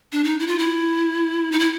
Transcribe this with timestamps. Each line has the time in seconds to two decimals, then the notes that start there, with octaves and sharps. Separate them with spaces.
0.12 D4
0.24 D#4
0.40 E4
0.47 F4
0.59 E4
1.52 D#4
1.59 E4